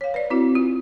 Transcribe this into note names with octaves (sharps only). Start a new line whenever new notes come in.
C#5 F5
B4 D5
C4 E4 F#4
F4